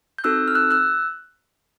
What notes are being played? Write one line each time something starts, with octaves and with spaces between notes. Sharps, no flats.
G6
C4 D#4 F#4 A4 E6 F#6
F6
E6 F#6
E6 F#6